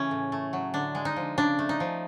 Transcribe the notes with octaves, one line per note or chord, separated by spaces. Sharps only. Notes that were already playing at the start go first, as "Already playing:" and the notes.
Already playing: C#3 E3 A3 C#4
A2
A3
F#3
D3 D4
G#3
D#4
F3
C#3 D4
A3
D#4
F3